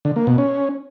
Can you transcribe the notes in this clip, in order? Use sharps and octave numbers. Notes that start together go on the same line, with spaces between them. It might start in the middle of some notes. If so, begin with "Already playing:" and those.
D3
A#3
B2
C#4